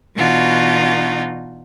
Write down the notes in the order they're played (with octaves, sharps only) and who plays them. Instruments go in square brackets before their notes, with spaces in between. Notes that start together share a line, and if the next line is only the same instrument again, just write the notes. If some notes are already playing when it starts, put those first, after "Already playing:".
[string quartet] B2 E3 D4 D#4 F4 F#4